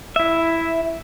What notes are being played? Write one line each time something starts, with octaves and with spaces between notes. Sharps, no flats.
E4 E5